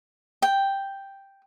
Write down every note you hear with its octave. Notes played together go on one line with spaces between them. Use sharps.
G5